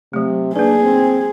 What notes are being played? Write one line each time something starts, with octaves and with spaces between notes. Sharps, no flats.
C3 F#3 A3
A#3 D4 G#4 B4
C4